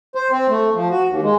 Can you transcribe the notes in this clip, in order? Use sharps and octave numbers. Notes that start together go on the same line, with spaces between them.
C5
C4
A3
F3
F#4
D#2
G#3